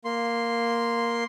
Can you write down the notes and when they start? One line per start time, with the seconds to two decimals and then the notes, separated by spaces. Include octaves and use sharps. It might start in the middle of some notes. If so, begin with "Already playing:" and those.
0.05 A#3 C6